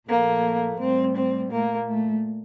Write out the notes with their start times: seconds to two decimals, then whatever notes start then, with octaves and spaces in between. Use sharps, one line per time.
0.08 A#2 F3 A3 A#3
0.79 A2 G3 C4
1.16 C4
1.51 A#2 A3 A#3
1.87 A3